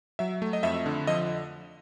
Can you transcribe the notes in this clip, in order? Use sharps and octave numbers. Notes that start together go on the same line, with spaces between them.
F#3 E5
A3
D#5
F2 E5
D3
F3 D#5